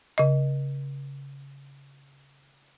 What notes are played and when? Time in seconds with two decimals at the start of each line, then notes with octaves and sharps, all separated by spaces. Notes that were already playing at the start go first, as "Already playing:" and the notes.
0.18 C#3 D#5